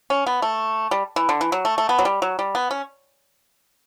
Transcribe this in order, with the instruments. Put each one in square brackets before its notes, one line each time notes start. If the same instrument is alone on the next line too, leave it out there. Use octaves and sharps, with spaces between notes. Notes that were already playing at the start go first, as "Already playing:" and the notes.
[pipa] C#4
B3
A3
G3
E3
D3
E3
F#3
A3
A3
B3
F#3
G3
F#3
G3
B3
C#4